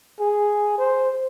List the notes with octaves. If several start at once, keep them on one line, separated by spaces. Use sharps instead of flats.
G#4
C5